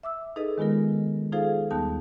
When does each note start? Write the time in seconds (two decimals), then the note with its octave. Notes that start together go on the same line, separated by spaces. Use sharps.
0.03 E5 D6 E6
0.36 D#4 G#4 A4 B4 D#5
0.58 D#3 G#3 B3 F4 A#4
1.32 D#4 F4 G#4 A4 C5 F5
1.71 D#2 G3 B3 D#4 A5 G6